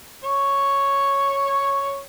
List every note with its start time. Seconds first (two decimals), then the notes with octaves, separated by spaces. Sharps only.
0.24 C#5 C#6